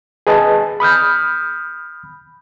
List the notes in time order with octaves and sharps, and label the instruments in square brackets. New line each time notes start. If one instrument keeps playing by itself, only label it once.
[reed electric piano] G#4 B4 D#5 A5
B5 D#6 F6 G6